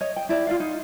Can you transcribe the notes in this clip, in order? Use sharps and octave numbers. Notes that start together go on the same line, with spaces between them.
C#5 D#5
G5
E4 D5
F4 D5 F5
D#4